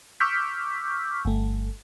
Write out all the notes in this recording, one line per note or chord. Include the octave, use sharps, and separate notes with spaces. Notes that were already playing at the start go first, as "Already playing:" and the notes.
C#6 D6 E6 F6 G6 B6
G1 A3